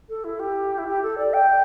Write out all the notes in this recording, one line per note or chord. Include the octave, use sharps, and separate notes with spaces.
A4
E4
G4
E4
G4
A4
D5
G5